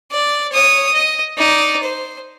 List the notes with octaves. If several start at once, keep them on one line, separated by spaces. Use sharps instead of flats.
D5
C#5 D#6
D#5
D#4 D5
C5